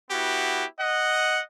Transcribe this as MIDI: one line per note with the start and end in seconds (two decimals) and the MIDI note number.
0.11 0.65 59
0.11 0.65 64
0.11 0.65 66
0.11 0.65 67
0.79 1.40 75
0.79 1.40 78